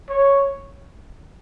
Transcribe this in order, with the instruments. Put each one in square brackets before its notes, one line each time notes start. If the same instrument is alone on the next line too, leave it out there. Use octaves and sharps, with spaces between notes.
[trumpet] C#5